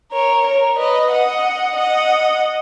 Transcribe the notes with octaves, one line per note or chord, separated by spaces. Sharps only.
A#4 C#5
A#4 C#5
B4 D#5
D#5 F#5
D#5 F#5